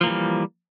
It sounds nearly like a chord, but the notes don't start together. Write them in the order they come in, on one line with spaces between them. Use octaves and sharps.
F3 A#3 E3 G3